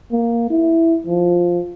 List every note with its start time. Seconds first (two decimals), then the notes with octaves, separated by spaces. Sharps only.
0.12 A#3
0.50 E4
1.07 F3